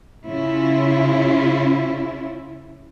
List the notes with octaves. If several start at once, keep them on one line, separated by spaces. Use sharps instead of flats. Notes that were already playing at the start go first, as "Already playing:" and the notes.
C#3 C#4 E4 F4